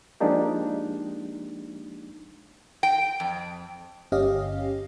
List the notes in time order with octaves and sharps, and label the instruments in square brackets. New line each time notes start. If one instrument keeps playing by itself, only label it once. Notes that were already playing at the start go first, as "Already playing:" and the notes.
[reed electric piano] F3 G#3 A#3 D4 D#4 G4
[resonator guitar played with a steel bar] G5
F2
[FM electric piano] G1 C#4 G4 D#5 F5